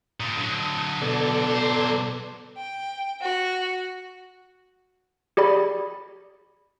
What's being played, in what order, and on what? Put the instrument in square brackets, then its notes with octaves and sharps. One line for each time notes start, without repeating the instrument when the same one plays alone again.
[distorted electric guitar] A#2 D3 [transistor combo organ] D#6
[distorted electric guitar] D3 F#3
[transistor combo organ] B2 A4 D5
[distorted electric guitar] F#3 C5
[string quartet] G5
F#4
[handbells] G4 G#4 D5 B5